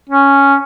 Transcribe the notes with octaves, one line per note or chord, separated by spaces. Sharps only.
C#4